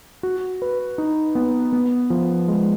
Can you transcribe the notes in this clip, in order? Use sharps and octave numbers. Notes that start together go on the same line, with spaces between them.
F#4
B4
D#4
B3
B3
F3
G#3